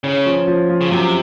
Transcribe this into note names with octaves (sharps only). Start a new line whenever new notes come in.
C#3 C#4
F3
F3
F3
C#3
F#2 C3